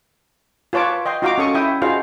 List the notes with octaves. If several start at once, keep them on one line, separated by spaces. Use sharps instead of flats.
F4 B4 C#5 A5 D6
D#5 G5 C6
D#4 F4 F#4 F5 A#5 D6
C#4 A4 C#6 D#6
E4 E5 G5 D#6
D#4 F4 F#4 G#4 C5 F5